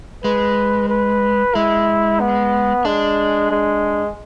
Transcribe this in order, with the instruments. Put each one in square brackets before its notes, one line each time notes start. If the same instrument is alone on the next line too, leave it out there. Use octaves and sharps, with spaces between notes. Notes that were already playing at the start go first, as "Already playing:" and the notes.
[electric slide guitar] G#3 [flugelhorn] B4
[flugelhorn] B4
[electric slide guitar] G#3 [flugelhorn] E4
[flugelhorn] B3
[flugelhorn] G#3 [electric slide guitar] D4
[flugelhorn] G#3